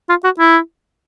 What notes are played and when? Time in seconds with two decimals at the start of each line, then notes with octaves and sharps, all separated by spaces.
0.10 F4
0.24 F#4
0.39 E4